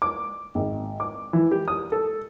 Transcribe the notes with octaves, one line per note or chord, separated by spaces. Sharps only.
D6
G#1
D6
E3
G4
D#6
A4